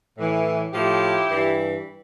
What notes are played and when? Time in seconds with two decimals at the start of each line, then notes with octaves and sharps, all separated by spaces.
0.17 A2 E3
0.72 A2 F3 E4 G4
1.30 G2 E3